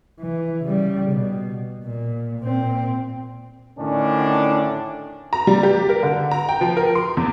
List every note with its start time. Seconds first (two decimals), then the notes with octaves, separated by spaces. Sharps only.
0.20 E3
0.65 C#3 G3
1.11 B2
1.84 A#2
2.40 A#2 C4
3.79 A2 D3 D#3 C#4 D4
5.33 A#5
5.47 G3
5.63 G4
5.89 A#4
6.03 D3
6.31 A#5
6.49 G5
6.61 F3
6.77 A#4
6.95 C6
7.17 E2